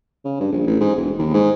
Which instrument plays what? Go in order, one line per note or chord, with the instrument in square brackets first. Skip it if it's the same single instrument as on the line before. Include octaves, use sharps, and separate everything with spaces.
[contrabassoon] C#3
G2
A#1
A1
G#2
E1
D#2
G#2